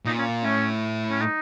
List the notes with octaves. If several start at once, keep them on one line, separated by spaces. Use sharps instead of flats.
A#2 D#4
C#4
A2 C#4
C#4
D#4